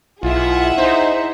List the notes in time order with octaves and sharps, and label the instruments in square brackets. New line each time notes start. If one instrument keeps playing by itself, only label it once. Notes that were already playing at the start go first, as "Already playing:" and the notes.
[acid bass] B1 [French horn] E4 [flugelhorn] F4 [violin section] G#4 E5 F#5
[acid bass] D#4 [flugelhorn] C5